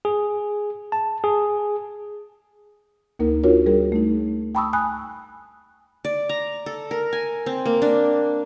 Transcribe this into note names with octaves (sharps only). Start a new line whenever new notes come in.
G#4
A5
G#4
D2 A#3 D#4 A#4
D4 F4 F#4 A#4 C#5
G3 G#4 A#4
A3 D#4
G5 A5 B5 C#6 D#6 E6
G#5 B5 D#6 F#6
D5
A#5
A4
A#4
G#5
C4
A#3
D4